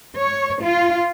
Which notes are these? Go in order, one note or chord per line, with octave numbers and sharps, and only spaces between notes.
C#5
F4